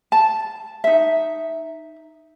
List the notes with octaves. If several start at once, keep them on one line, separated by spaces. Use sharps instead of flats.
A5
D#4 E5